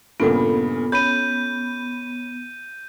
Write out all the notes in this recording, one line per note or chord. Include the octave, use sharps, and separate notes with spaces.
G2 A#2 C#3 B3 F4 A4 F#5
C#4 B5 G6 D#7